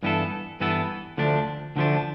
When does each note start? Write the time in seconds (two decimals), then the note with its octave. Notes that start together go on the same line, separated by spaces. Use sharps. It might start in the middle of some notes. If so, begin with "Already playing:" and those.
0.03 G2 E3 B3 E4 A4
0.60 G2 E3 B3 E4 A4
1.17 D2 D3 F3 A3 D4
1.76 D2 D3 F3 A3 D4